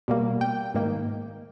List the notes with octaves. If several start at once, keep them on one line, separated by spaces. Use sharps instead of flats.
B2 G3 A#3
G5
G#2 D#3 A#3